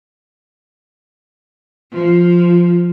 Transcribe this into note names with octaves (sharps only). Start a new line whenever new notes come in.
F3